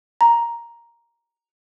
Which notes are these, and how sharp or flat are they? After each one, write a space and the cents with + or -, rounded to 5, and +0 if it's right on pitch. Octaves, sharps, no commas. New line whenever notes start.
A#5 +5